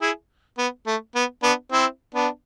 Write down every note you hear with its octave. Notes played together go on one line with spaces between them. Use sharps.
E4 G#4
B3
A3
B3
B3 D4
C4 E4
B3 D4